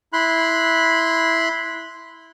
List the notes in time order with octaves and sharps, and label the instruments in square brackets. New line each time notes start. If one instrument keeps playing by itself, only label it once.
[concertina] E4 B5 C6 F#6